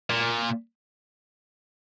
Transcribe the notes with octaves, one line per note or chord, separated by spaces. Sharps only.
A#2